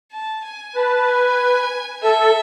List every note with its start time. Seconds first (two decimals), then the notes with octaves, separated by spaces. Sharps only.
0.12 A5
0.44 G#5
0.75 B4 A5
1.08 G#5
2.03 A4 E5
2.19 A4